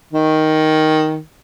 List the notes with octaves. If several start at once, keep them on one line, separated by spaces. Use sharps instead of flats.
D#3